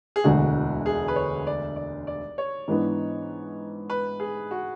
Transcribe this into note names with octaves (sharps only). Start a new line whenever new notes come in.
G#4
E1 D2 D3 G#3 F#4
G#4
B4
C#5
D5
D5
D5
C#5
G#2 E3 B3 D4
B4
G#4
F#4